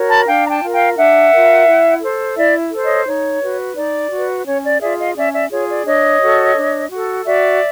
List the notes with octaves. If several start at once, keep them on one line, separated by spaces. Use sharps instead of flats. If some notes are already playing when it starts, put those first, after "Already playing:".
Already playing: F#4 A#4 C#5
A5 B5
D4 F5 G5
A#5
G5 A5
F4 A#4
F5 G5
D4 E5 F#5
F4 A#4
E4
A4 C5
E4 D5 E5
A4 C5
C#5 D#5
D#4 C#5
F#4 B4
D#4 D5
F#4 B4
C#4 C#5
D5
F4 G#4 D5 E5
D#5 F5
C#4 D5 E5
D5 E5
F4 G#4 C#5
D5
D4 C#5 D#5
F#4 A4
D4
F#4 A4
F#4 D5 E5